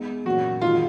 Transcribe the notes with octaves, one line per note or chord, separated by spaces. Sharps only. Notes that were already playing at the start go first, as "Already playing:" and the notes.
Already playing: G#3 B3 D#4
A#2 F#3 C#4 F#4
D#3 G#3 D#4 F4 F#4